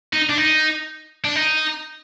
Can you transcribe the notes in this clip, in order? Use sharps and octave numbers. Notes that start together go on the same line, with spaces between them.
D#4
D4
D#4
D4
D#4